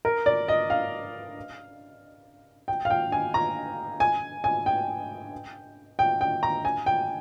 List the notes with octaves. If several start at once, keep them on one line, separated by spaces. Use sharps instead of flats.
A#4
D5
D#5
F5
G5
F5
G5
G#5
A#5
G#5
G#5
G5
G5
G5
A#5
G#5
G5